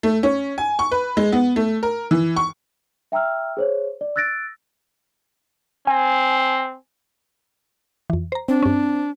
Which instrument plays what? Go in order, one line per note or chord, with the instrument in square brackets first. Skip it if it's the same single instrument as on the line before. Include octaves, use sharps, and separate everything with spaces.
[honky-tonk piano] A3
C#4
G#5
C#6
B4
G#3
B3
A3
A#4
E3
C#6
[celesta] E5 G5 A#5 E6 F6
G#4 C5 C#5
D5
E6 F#6 A6 A#6 D7
[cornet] C4 [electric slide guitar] G#5
[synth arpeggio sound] F2 E3
C5 A#5
[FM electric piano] C4 [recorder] D4
[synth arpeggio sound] G2 C#4